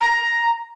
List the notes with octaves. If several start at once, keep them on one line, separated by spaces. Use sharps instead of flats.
A#5